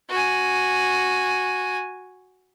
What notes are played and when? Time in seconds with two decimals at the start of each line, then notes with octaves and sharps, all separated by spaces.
0.10 F#4 G#5